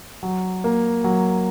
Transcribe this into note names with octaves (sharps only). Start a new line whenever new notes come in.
F#3
A#3
F#3